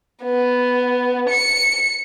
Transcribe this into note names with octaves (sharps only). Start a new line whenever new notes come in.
B3
C#7